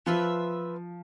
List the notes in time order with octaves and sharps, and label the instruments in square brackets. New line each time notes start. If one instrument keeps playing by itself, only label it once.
[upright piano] F3 [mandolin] B3 F4 B4 E5